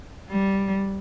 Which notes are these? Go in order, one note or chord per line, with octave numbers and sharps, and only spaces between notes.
G3